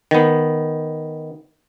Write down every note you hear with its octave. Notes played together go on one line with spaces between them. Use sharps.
D#3 B3